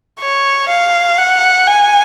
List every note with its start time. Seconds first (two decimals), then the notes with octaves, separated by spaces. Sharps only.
0.20 C#5
0.69 F5
1.18 F#5
1.67 G#5